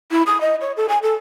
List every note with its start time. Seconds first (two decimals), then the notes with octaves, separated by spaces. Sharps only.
0.11 E4
0.27 D#6
0.41 D#5
0.61 C#5
0.77 A4
0.89 G#5
1.03 A4